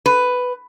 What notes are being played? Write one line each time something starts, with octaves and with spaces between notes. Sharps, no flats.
B4